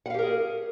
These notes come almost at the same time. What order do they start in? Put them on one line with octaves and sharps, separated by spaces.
F#5 F5 G4 A#4 G#4